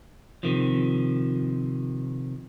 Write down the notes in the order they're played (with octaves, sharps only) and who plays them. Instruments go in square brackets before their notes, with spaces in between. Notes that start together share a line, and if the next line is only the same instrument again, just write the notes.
[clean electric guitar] C3 D#3 F3